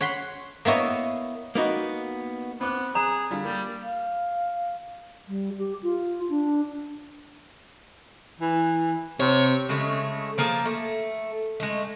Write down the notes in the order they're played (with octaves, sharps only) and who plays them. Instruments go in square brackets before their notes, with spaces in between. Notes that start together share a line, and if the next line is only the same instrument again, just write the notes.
[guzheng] C#5 F#5 B5 C6
A#3 B3 E4 C#5 D#5
[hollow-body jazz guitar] A#3 B3 D#4 F#4
[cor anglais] B3 [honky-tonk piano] C4 D6 F#6
[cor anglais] G#4 [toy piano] A#5
[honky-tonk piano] D3 G3 F4
[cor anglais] G3 [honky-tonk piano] A#3
[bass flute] F5
G3
G4
F4
D4
[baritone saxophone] E3
[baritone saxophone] C3 [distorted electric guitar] C#5
[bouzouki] C#3 G#3 A3
F3 A#3 G#4 A5
A3
G#3 A3